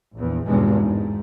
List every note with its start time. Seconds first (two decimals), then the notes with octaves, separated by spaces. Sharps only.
0.13 A#1 E2
0.47 G#1 E2 G2 B2 G#3
0.85 G#2